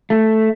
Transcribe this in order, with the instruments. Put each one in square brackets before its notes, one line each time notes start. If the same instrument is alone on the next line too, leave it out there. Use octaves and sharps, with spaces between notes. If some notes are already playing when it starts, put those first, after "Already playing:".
[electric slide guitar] A3